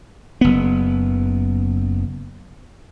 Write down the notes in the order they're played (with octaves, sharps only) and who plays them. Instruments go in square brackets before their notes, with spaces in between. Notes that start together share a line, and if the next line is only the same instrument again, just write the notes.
[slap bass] F#1 B3